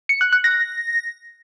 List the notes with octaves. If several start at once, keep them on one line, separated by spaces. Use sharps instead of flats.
C#7
F#6
F#6
A#6